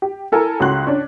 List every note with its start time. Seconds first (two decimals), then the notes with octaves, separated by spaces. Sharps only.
0.02 G4
0.32 E4 A4 A#4 G#5
0.60 C#2 C#3 F#4 C6 F#6
0.87 C#4 D4